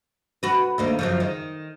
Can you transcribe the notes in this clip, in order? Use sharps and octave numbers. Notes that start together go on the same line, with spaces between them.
F#4 B4
D2 D#3 A#3
F#2 C#3 F3
D#3